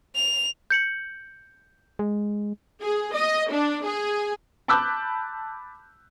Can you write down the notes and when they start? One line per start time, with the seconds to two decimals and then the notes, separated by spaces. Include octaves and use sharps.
0.15 F7
0.70 G6 C#7 F#7
1.99 G#3
2.81 G#4
3.14 D#5
3.52 D4
3.86 G#4
4.68 A5 B5 D6 E6 F#6 G6